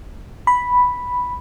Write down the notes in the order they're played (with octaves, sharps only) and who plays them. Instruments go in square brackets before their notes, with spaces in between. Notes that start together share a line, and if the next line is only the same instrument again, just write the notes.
[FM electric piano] B5